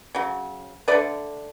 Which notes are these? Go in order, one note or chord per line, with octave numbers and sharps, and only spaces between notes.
C#3 F#3
D3 A3 B4 D5